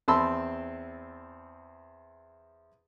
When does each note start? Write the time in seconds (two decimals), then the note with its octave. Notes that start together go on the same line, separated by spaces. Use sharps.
0.08 E2 C4 A5 B5 C6 E6